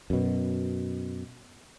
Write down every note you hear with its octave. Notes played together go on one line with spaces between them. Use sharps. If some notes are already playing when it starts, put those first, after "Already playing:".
F#2 B2